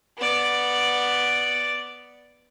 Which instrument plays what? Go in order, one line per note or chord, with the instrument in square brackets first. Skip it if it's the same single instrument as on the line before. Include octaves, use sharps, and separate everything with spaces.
[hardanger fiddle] B3 D5